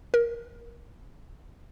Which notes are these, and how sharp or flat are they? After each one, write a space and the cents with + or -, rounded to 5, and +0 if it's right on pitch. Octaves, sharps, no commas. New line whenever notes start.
A#4 +10